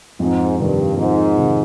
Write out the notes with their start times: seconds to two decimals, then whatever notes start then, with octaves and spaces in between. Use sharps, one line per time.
0.20 F2 G#2
0.58 G2 C3 D#3
0.97 F2 G#2
1.36 C3 D#3